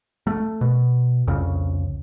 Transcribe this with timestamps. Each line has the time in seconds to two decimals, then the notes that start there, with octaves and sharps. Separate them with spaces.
0.27 A3
0.61 B2
1.27 C2 F2 C#3